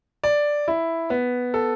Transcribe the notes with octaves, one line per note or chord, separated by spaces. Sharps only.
D5
E4
B3
A4